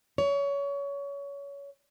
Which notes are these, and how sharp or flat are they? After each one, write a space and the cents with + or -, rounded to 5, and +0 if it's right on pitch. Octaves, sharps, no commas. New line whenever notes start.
C#5 +25